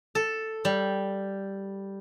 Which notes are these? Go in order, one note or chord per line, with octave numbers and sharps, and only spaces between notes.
A4
G3